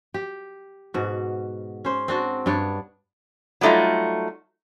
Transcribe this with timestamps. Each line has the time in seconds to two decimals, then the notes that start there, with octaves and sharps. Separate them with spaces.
0.14 G4
0.94 G#2 B2 F#4
1.85 C#4 C5
2.08 C4 D4 F#4
2.46 G2 B3 D4 C#5
3.61 F#3 G3 A3 D#4 F4